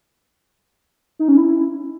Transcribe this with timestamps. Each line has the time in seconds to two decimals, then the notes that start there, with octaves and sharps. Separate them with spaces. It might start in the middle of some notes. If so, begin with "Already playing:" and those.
1.19 D#4
1.28 C#4
1.37 E4